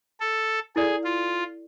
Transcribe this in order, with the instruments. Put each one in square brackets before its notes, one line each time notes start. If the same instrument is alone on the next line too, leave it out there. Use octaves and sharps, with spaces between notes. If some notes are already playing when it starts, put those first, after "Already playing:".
[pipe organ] A4
[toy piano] E4 A4 D5 [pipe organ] G#4
[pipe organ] F4